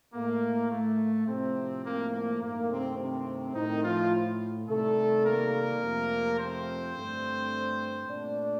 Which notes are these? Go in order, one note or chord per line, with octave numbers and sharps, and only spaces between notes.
A2 A3 A#3
A3
A2 C3 F3 A3 C4
A#3
A#3
G2 D#3 A3 A#3
C3 C4
C3 C4
A2 D#3 A3 D#4
F3 F4
C3 D#3 G3 A3 A4
A#3 A#4
F2 C3 F3 A3
C4 C5
G2 D3 A3
A#2 A3 D4 D5